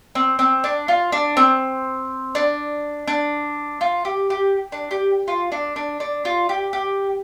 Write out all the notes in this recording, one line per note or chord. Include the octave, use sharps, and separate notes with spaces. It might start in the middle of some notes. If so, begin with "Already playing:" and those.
C4
C4
D4
F4
D4
C4
D4
D4
F4
G4
G4
D4
G4
F4
D4
D4
D4
F4
G4
G4